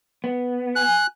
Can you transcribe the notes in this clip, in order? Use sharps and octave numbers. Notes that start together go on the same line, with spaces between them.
B3
G#5 F#6